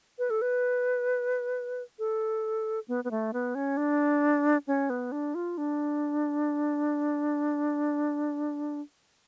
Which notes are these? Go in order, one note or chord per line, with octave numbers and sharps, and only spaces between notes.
B4
A4
B4
A4
B3
B3
A3
B3
C#4
D4
C#4
B3
D4
F4
D4